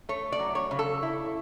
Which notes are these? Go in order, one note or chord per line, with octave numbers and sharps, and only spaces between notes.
A3 C#5
D5
F#3
C#5
C#3
A4
E4